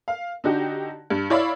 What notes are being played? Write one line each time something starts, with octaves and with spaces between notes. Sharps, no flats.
F5
D3 D#4 F#4 G4
G2
E4 C#5 D5 F5 B5 E6